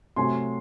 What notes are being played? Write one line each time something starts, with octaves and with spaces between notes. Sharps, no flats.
C3 F#3 A3 G#5 C6